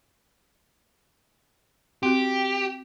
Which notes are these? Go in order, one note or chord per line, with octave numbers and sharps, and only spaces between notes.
C4 F#4 G4